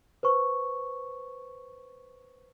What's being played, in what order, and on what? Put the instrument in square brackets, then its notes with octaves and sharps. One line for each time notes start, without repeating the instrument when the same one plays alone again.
[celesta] B4 C5 C#6